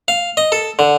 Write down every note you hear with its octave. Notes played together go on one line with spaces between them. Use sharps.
F5
D#5
A4
D3